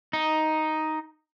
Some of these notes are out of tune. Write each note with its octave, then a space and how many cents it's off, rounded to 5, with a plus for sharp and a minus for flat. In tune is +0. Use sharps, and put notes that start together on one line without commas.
D#4 +5